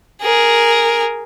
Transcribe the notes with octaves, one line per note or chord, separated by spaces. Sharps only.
G#4 A#4